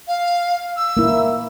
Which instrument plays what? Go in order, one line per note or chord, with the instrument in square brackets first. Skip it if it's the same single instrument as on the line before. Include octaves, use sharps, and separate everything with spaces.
[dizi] F5
E6
[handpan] A#3 E4